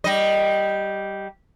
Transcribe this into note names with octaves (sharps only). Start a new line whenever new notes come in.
G3 D#5